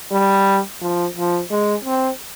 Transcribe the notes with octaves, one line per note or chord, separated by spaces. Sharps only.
G3
F3
F3
G#3
C4